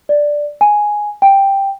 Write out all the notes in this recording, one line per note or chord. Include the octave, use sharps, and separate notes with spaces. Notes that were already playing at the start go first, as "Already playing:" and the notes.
D5
G#5
G5